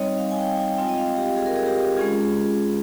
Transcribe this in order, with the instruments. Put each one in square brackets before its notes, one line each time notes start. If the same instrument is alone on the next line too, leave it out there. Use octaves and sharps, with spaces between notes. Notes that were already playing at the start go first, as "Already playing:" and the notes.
Already playing: [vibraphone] G3 C4 D#4 C#5 D#5
F5
G#5
G5
G#5
G#3 C4 F4 G5
D#5
F5
G4
G#4
A#4
G#4
G4
G#3 C#4 F4 G#4